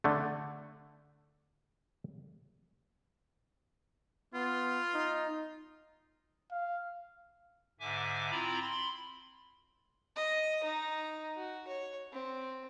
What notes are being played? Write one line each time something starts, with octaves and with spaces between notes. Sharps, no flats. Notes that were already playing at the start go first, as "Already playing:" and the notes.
D3 A3
B3 F4
D#4
F5
G#2 D3 E5 G#5 D6
C4 E4 F4 A#5 B5
B5 C6
D#5
D#4
F#4
C#5
C4